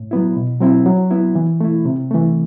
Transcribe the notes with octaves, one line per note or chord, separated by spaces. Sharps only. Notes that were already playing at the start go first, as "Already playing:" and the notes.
Already playing: A2
F#3 B3 E4
B2
F#3 C4 E4
F#3
B3 E4
E3
A3 E4
C3
E3 A3